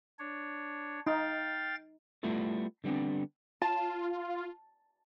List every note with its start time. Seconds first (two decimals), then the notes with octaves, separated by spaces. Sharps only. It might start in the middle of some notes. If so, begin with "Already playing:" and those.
0.19 D4 C#5
1.07 D#4 F5 G5 A6
2.23 G3 A3 B3 E4 F4 A4
2.84 D3 G3 B3 C4 D4
3.62 F4 A5